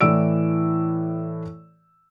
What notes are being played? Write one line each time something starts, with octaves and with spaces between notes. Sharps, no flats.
A2 E3 D5 E6 D7